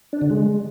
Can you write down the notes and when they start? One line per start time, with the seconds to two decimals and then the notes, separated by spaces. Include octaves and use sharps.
0.13 D4
0.21 D3
0.30 G#3